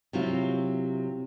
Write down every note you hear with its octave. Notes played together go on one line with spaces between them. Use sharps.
C3 F#3 E4 F4